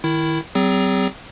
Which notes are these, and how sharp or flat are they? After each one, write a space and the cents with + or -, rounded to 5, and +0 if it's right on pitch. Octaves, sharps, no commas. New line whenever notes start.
D#3 +0 E4 +0
F#3 +40 C4 -25 G#4 -35